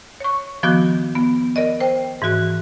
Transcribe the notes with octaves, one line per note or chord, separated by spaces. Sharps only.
C#5 C#6
D#3 F3 B3 F#4 D6 G6
B3
A#4 D5 D#5
C5 G5
G#2 E3 F#4 F#6